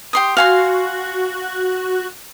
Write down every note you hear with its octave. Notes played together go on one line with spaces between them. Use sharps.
G4 C6 D#6
F#4 F5 G#5 C6